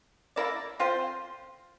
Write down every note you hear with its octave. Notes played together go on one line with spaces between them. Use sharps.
A#3 E4 A#4 D5
F3 C4 F4 C5